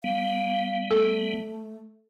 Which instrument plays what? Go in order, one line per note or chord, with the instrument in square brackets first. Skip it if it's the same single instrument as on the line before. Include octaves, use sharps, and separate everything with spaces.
[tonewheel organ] G3 B3 [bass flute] F5
[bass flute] A3 [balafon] A4